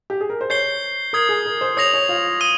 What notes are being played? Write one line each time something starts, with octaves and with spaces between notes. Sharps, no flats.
G4
G#4
A#4
C5
C#5 G6 C7 G7
A#4 D#6 G#6 C7
G#4
A#4
C5
C#5 D#6 A#6 F7
C#5
F4
D#6 A#6 D#7 G7